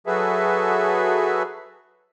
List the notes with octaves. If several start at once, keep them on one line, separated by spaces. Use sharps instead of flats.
F#3 F#4 G#4 A4 B4 E5